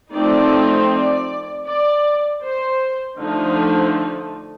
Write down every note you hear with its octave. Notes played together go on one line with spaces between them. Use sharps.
F3 A3 C4 D#4 D5
D5
D5
C5
D3 F3 A3 D#4